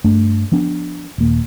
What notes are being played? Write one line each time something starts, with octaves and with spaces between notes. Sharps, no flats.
G2 A3 D4
F3 B3 D4
D#1 A#3